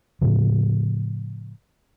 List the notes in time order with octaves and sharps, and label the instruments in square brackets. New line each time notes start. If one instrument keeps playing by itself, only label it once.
[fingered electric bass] A2 C#3 F3